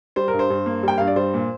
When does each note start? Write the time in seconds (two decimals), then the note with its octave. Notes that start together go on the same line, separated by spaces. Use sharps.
0.16 G3 C5
0.28 G2 A#4
0.39 C5
0.50 G2
0.66 A#3
0.83 G3 G5
0.98 G2 F5
1.08 D5
1.16 G3 C5
1.34 A#2